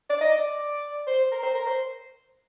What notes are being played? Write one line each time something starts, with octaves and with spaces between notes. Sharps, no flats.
D5
D#5
D5
C5
A#4
C5
A#4
C5